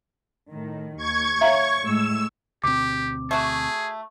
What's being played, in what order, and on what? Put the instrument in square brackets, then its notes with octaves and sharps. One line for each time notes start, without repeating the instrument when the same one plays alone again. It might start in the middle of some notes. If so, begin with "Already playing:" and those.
[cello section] A2 D#3
[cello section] D#2 [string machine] C#6 G#6
[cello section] C#5 [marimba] E5 F5 A#5
[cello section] A2 G#3 A3 [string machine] E6
[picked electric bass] D2 B2 C4 [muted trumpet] G4 [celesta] D6
[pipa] A3 F#4 [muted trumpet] G#4